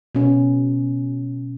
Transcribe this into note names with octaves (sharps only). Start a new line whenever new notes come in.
B2 C#4